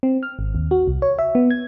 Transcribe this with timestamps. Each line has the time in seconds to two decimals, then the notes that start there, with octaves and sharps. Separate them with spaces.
0.03 C4
0.23 F6
0.39 G#1
0.55 D#2
0.71 F#4
0.87 C2
1.02 C#5
1.19 E5
1.35 B3
1.51 G#6